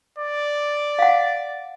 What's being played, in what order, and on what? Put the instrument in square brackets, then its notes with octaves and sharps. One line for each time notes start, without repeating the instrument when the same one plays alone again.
[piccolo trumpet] D5
[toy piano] F5 F#5